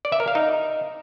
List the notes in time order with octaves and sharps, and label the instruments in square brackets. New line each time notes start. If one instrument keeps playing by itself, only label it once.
[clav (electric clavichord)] D5
E5
A#4
F5
D#4